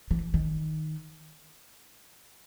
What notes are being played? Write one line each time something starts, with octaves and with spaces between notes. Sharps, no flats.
E3
D#3